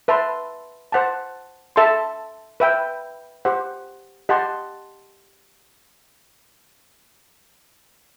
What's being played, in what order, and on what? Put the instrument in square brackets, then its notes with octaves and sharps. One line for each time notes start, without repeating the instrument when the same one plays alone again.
[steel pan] B4 E5 A5 C6
C5 F#5 A5
A4 E5 A5 C6
B4 E5 G5
G4 C5 F#5
G4 D#5 F#5 A5 C6